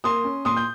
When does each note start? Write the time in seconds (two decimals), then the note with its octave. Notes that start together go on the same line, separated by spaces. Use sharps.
0.04 A#3 C6 D#6
0.24 C#4
0.45 A#2 C6 D#6
0.57 G6